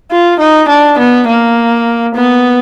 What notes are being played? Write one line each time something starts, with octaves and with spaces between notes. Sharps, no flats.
F4
D#4
D4
B3
A#3
B3